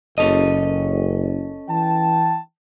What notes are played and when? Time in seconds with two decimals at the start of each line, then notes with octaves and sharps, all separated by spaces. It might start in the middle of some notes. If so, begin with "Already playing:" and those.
0.18 F#1 C#4 A4 D#5
1.69 E3 G5 A5